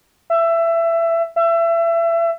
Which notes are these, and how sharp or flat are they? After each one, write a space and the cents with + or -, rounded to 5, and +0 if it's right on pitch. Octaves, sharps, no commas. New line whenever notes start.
E5 +20
E5 +30